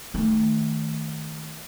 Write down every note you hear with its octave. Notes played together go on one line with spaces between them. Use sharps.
D#3 A3